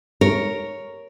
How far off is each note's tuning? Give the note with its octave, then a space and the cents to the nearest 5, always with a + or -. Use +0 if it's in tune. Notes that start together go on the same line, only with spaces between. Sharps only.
A#4 +0 C#5 +5